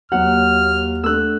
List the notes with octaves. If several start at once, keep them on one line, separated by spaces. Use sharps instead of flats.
D#2 F#3 A#3 F#5 F6
A3 D4 E6 F#6